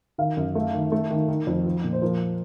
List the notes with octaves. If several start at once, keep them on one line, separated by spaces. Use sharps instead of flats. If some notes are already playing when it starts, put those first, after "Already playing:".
D#3 F5
F#2
A3
D#3
A3
D#3
D#3
F2
F3
A#2
C5
F3 A#4